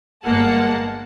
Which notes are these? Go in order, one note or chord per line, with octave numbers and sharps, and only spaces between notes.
G1 G#3 A#3 F#5 A5